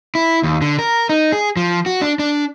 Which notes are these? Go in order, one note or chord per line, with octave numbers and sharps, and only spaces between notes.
E4
D#2
D3
A#4
D#4
G#4
F3
F#4
D4
D4